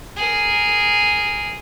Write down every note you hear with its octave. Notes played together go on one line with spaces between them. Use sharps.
G#4 A#4